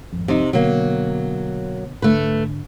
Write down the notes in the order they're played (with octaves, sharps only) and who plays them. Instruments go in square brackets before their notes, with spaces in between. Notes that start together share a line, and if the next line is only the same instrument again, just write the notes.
[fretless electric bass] G#1 F2
[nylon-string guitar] C3 D#4
[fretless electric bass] B2 D3 B3 [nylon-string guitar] F#3 A#3
[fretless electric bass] G#2 D3 D4 [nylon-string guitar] A3 B4